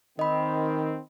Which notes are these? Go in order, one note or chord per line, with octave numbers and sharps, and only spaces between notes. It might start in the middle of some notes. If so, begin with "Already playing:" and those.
D#3 C4 D#5 B5